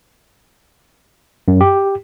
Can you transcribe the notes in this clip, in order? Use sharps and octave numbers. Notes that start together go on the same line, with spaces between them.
F#2
G4